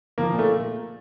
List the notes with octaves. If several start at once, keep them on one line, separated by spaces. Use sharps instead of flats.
F3 A#3
A#2
A3